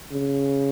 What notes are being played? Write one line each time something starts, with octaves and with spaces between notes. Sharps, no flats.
C#3